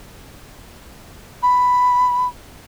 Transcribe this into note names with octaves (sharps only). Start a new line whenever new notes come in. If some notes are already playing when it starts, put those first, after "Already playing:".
B5